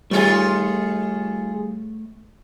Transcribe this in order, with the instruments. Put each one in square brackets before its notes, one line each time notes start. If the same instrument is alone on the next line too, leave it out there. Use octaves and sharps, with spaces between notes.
[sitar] D#3 F4 G#4 [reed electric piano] G3 [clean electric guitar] A3 C#5